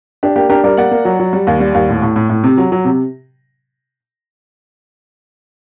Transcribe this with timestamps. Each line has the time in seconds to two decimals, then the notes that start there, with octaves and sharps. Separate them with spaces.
0.23 D4 G4
0.36 A#3 G4
0.50 D4 G4 A#4
0.64 G3 A#4 D5
0.77 A#3 D5 F#5
0.91 A#3
1.05 F#3
1.20 F#3
1.33 G3
1.47 D#2
1.60 G3
1.74 D#2
1.89 A2
2.02 A2
2.16 A2
2.30 A2
2.43 C3
2.57 F#3
2.72 F#3
2.85 C3